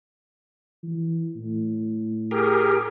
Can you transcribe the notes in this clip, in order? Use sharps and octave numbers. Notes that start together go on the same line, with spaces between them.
E3
A2
G4 G#4 A#4